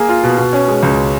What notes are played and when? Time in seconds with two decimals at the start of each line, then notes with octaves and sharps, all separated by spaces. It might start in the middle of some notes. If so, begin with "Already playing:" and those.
Already playing: A#3 G#4
0.09 F4
0.23 B2
0.38 B2
0.53 C#4
0.68 G#3
0.83 C#2